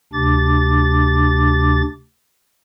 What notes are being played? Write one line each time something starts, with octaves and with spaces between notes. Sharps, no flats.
D2 C3 D4 D6 A6